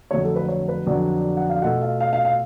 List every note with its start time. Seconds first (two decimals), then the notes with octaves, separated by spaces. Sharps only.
0.11 F2 D3 F#3 A3 C#5
0.24 A4
0.36 B4
0.48 C#5
0.68 B4
0.86 F2 D3 F#3 B3 D4 D5
1.37 F#5
1.49 F5
1.62 B2 A3 F4 A4 F#5
1.82 F5
2.01 F5
2.13 F5
2.25 F5